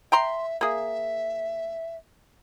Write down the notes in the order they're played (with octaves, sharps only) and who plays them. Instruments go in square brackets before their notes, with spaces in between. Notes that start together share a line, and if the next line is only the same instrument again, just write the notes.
[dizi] E5 [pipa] G5 A#5 C6
[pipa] A#3 G#4 [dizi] E5